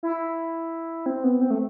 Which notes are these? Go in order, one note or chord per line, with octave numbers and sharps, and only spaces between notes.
E4
C4
B3
C4
A3